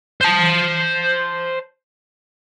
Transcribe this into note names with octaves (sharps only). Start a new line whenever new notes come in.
C5 A5